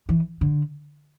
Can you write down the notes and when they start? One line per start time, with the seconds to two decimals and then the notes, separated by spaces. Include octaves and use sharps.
0.09 E3
0.41 D3